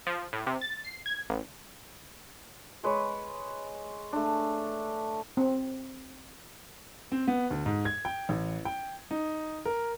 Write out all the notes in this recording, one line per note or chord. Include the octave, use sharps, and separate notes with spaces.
F3
A2
C3
A6
C7
G#6
A1
G#3 B4 C#5
A3 D4
C4
C4
B3
D2
G#2
G#6
G5
A1
G5
D#4
A#4